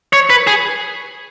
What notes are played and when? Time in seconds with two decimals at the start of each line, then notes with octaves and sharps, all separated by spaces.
0.13 C#5
0.30 B4
0.47 G#4